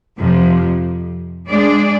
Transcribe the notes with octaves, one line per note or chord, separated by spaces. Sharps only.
F2 C3 F3
G#3 D4 G#4 D5